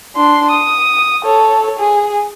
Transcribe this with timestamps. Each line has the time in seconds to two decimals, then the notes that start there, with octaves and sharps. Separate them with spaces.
0.16 D4 C6
0.51 D#6
1.24 A4 C#5
1.79 G#4